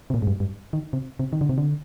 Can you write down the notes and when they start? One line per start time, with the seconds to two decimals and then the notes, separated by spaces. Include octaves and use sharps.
0.10 C3
0.14 A#2
0.22 G#2
0.27 G2
0.40 G2
0.73 D#3
0.93 C3
1.19 C3
1.33 D#3
1.41 D3
1.49 C3
1.58 D3